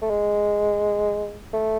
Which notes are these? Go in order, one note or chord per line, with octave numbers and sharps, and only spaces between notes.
A3
G#3
A3